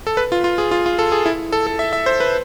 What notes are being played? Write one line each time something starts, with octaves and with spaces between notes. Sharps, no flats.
A4
B4
F4
F4
G#4
F4
F4
A4
G#4
E4
A4
A4
E5
E5
C5
B4